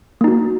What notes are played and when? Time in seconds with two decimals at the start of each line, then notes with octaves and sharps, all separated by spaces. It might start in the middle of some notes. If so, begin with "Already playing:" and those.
0.21 A#3
0.24 D#4
0.28 F#4